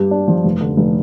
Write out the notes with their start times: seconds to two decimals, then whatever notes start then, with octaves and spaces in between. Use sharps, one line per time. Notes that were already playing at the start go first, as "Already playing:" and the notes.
Already playing: G2 G4
0.11 D4
0.28 F3
0.44 F1
0.61 D3
0.77 F1